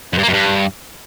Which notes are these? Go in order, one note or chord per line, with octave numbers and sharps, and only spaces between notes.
F2
G2
A#3
F#2
G2